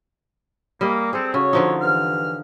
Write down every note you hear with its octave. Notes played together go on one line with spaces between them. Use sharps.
G3 A#3 D#5
C4 G#4 A4
C#3 F#4 C#5
D3 F3 D#4
G2 E3 F6